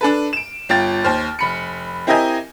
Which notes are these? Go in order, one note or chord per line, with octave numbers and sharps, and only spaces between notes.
D4 A4 B4
D7 E7
G1 F4 G5 A6
D#2 C5 F6
F1 B5 C#7
C4 E4 G4 A#4 D#5 G#5